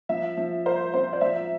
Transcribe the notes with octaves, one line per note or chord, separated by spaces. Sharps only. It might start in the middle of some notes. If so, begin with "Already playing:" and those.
F3 E5
F3
A#4 C5
C4 C5
D5
F3 E5